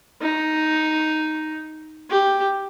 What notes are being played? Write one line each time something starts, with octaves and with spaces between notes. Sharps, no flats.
D#4
G4